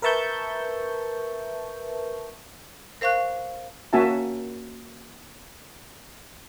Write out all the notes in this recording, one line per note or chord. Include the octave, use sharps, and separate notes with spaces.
A#4 B4 E5 A5 C#6 G6
A#4 C5 F5 C#6 F#6
A#3 C#4 F#4 E5 G#5 A5